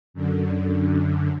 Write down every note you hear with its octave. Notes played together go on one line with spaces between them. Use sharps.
F#2 D3